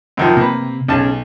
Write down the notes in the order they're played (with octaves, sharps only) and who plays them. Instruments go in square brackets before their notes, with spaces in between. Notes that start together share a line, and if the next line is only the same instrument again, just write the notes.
[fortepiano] F#2 D#3 F3
[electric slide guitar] C3 [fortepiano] A#3 B4
[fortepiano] B1 A5 [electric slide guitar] C#4 G#4